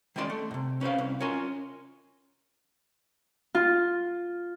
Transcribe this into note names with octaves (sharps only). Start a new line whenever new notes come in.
D#3 G#3 C#4 E4 D5 C6
A3
G#2 C3
C#4 B4 C5 F5
C2
C#4 F4 A#4 C#5 G#5 C6
F4